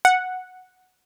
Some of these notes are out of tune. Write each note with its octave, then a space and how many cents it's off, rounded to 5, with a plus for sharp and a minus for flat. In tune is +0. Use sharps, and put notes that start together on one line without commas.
F#5 -5